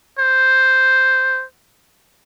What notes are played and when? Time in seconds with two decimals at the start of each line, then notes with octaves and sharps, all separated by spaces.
0.19 C5